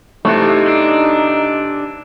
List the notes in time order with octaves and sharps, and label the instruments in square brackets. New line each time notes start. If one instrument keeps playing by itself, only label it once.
[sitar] C3 E3 B3 [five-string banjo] A3 [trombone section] D#4
[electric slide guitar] D4